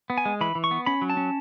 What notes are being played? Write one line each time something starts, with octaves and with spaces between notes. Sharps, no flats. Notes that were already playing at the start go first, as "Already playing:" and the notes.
B3
G#5
G#3
E3 B5
E3
C#6
B3
C#4 B5
F#3
A5
C#4